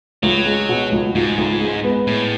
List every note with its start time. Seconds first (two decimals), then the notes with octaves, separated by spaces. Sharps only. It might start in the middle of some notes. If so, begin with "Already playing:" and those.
0.23 C#2 F#3
0.46 G#3
0.69 B2
0.92 C#2
1.15 C#2 G#2
1.38 C#2
1.61 G#3
1.84 B3
2.07 A2 G#3